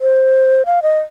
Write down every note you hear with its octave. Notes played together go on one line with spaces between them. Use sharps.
C5
F5
D#5